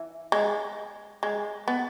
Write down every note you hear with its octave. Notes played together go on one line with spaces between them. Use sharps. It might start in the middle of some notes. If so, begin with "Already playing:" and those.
Already playing: E3
G#3
G#3
B3